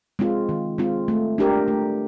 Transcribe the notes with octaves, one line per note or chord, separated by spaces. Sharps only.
G#3 C4 F4
D#3
G#3 C4 F4
A3
D4 G4 A#4
A3